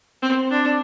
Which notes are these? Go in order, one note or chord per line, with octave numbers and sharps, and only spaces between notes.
C4
D4